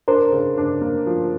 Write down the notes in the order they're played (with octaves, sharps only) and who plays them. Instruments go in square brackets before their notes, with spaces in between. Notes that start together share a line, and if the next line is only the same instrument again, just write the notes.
[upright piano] D4 [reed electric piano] A#4 C5
[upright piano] C#3
D4
A#3
F3